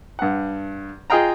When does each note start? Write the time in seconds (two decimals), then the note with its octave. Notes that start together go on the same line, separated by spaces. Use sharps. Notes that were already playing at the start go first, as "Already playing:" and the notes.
0.19 G2 F#5
1.10 F4 G#4 D#5 F5 G5 A#5